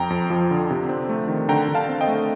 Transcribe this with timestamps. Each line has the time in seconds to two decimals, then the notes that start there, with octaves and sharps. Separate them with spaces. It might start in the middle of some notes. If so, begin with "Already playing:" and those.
Already playing: F2 G5 A#5
0.10 F2
0.30 F3
0.51 D3
0.70 C3
0.89 C4
1.09 A3
1.28 D#3
1.49 D3 G5 A#5
1.69 D3
1.75 F5 A5
1.89 C4
2.01 D#5 G5
2.08 A3